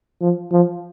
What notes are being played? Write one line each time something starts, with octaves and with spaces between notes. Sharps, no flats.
F3
F3